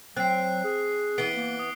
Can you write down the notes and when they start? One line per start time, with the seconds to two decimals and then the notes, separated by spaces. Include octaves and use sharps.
0.17 F#3 C4 F#6 C7
0.64 G#4
1.18 E3 B3 C7 D7 G7
1.36 A#3
1.59 D#6